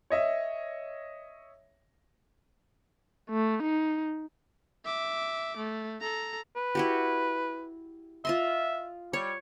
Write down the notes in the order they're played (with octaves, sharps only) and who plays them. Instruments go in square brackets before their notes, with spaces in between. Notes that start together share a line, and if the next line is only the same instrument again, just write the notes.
[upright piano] C#5 D#5 E5
[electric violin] A3
D#4
E5 D6
A3
A4 A#5
[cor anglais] B4
[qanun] E4 F#4 G4
[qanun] F4 D#5 C6 [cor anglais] E5
[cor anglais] G3 [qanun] C#5